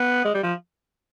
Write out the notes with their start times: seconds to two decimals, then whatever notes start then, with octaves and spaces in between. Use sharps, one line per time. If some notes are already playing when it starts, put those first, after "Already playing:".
Already playing: B3
0.25 G#3
0.34 G3
0.43 F3